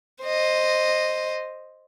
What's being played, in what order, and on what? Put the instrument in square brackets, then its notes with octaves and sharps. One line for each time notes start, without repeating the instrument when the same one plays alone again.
[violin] C5 D#5